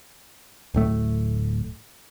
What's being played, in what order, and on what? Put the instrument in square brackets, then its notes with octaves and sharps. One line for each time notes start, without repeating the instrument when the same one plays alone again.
[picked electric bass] D1 A2 A3